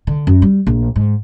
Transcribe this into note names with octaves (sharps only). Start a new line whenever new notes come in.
D3
F#2
G3
A#1
G#2